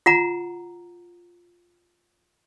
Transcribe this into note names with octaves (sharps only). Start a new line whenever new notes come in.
F4 F#5 A#5